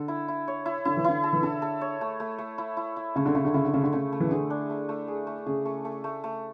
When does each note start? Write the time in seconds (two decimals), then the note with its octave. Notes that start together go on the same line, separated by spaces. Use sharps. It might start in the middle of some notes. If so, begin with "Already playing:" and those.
Already playing: D3 A4
0.08 E4
0.28 E4
0.48 C#5
0.66 E4
0.85 D3 E4
0.97 E3
1.04 D3 E4
1.24 A4
1.33 E3
1.42 D3 A4
1.62 A4
1.81 C#5
2.01 A3
2.20 A3
2.38 A3
2.58 E4
2.77 E4
2.96 E4
3.16 C#3 A3
3.26 D3
3.35 C#3 A3
3.45 D3
3.54 C#3 E4
3.65 D3
3.74 C#3 A3
3.83 D3
3.93 C#3 A3
4.12 A3
4.20 E3
4.31 D3 G#4
4.50 D4
4.70 A3
4.89 A3
5.08 G#4
5.27 A3
5.46 C#3 G#4
5.65 A3
5.85 A3
6.04 A3
6.24 A3